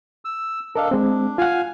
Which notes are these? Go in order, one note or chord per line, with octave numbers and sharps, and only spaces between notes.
E6
D4 A4 A#4 D#5 F5
G#3 C4 D4
F4 F5 F#5 G#5